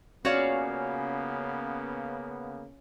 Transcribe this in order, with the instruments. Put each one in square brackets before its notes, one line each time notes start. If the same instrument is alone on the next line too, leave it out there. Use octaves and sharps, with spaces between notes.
[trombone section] C#3 A#3 B3 [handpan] C#4 F5 [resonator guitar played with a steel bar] F#4 C#5 D5